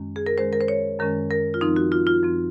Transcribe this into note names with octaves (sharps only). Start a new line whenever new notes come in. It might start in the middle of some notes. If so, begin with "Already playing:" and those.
Already playing: F#2 D#3 G#3 C#4
G#4
A#4
F#2 D#3 G#3 C#4 C5
A#4
C5
C#5
F#2 D#3 G#3 C#4 A#4
A#4
F4
F#2 F3 C4 D#4
F#4
F4
F4
F#2 F3 C4